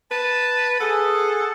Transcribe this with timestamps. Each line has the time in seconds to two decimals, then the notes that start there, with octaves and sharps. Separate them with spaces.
0.11 B4 A5
0.80 G#4 A4 F#5